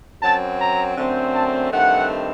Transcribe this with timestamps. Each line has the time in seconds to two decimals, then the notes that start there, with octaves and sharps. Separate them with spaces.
0.22 F#2 F#3 C4 A5
0.60 A#5
0.97 F#2 D3 A3 C4
1.34 A5
1.72 G2 D#3 A3 C4 F#5